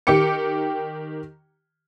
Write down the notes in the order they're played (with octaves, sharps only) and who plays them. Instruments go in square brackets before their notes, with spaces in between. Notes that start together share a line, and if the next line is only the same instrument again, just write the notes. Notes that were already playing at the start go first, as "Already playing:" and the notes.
[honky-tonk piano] D#3 G4 G5 D6 C#7